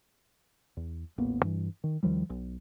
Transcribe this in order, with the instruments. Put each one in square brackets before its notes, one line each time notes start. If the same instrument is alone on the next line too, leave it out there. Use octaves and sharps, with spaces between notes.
[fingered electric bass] E2
D#1 A1 A#3 B3
G2 E3
D#3
D#2 D#3 F3 G3
B1